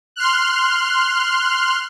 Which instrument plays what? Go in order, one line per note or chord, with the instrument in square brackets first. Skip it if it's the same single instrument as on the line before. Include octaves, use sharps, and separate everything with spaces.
[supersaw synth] C6 F6 F#6